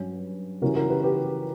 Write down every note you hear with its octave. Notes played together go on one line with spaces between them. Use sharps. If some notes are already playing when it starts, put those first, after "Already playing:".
Already playing: G2 F#3 C#4
C#3 E3 G3 C#4 F#4 A#4
F#4 A#4
G4 B4
G4 B4